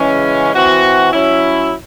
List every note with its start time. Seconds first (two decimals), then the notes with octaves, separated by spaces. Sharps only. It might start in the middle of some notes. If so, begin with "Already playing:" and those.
Already playing: C#3 E3 G#3 C#4
0.53 E3 C4 F#4
1.12 F#3 C#4 E4